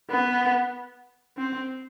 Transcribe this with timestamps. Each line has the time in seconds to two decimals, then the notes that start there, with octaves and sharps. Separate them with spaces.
0.10 B3
1.37 C4